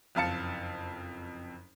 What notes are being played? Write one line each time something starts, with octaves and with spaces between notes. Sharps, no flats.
F#1 F2 F5 A5 C#7